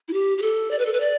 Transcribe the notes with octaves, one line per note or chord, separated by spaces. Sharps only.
E4
G4
G4
A4
D5
B4
A4
B4
D5